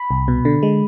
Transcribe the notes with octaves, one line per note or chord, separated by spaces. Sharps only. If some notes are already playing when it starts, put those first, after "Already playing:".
Already playing: B5
C2
B2
D3
G#3